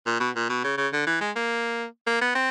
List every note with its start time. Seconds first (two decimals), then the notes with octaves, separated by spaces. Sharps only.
0.06 A#2
0.20 B2
0.35 A#2
0.49 B2
0.64 C#3
0.77 C#3
0.93 D3
1.06 E3
1.21 G#3
1.36 A#3
2.07 A#3
2.21 B3
2.35 C4